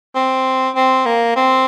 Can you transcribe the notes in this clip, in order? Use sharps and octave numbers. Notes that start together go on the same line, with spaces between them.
C4
C4
A#3
C4